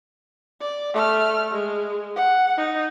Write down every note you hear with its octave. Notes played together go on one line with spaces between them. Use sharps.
D5
A3 F6
G#3
F#5
D#4